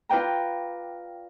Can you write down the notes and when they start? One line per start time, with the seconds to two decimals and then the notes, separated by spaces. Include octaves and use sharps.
0.09 F4 B4 D5 G5 A#5